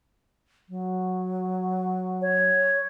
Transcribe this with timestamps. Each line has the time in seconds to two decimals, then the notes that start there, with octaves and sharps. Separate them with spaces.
0.69 F#3
2.21 C#5